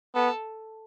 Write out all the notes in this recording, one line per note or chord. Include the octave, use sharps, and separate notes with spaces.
B3 A4